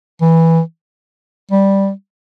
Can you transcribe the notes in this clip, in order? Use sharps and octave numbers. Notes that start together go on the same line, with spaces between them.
E3
G3